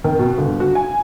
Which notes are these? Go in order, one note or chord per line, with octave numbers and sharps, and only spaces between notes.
D#3
B2
G1
F#4
G#5